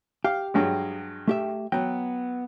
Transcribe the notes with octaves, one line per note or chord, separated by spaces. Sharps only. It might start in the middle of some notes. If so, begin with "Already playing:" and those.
G4 F5
G2 F#3 G#3
A3 G4 E5
F#3 B3 G5